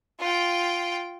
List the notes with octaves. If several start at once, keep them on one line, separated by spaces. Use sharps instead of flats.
F4 G5